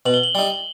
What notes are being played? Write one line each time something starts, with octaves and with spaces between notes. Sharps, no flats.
B2 F#7
G7
F#7
G3 D#4